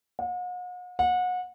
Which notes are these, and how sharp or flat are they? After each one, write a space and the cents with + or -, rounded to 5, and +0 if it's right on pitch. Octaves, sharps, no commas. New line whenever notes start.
F#5 -45
F#5 -30